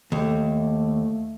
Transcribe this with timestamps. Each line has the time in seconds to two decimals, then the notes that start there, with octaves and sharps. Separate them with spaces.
0.12 D#2 A3